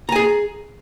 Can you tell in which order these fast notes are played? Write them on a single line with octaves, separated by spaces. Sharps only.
A#5 G#5 G#4